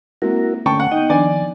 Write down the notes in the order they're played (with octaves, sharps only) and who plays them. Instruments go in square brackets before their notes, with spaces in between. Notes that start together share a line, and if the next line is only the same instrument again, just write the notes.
[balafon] G#3 A#3 C4 [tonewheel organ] E4 F#4 A#4
[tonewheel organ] D3 A3 C#4 [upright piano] G5 A5 C#6
[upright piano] F#5
[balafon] B3 D#4 [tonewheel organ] D#5 G5
[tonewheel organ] D#3 [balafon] F3 D4 [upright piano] D5 G#5